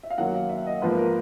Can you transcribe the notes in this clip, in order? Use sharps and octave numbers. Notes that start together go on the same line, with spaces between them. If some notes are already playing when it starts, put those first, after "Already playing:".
E5
F5
F#2 D#3 F#3 A#3 F#5
F5
E5
D#5
G#2 F3 A#3 B4
A#4